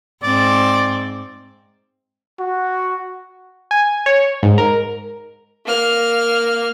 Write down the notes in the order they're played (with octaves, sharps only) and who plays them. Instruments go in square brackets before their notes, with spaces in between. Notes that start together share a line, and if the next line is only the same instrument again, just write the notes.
[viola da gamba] G#2 C4 [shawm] D5
[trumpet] F#4
[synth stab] G#5
C#5
G#2
A#4
[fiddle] A#3 F6